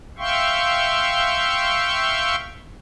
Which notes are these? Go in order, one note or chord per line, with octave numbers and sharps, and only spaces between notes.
E5 F5 G5 C6 C#6